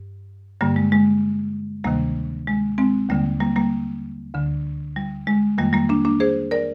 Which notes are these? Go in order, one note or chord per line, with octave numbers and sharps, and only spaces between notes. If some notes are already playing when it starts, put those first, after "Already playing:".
Already playing: G2
G2 D3 G3 A#3
G#3
G#3
D2 C3 D#3 G3 A#3
G#3
G#3 C4
D#2 D3 G3 A#3
G3 A#3
G3 A#3
D2 D3
G3
G#3
F2 D#3 G3 A#3
G3 A#3
A#3 D4
A#3 D4
G#4 C5
A#4 D5